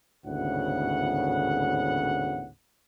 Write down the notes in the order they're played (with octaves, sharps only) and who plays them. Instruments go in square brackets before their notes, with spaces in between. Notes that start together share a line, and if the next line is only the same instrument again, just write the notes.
[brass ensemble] G#1 D2 A2 C#3 B3 F#5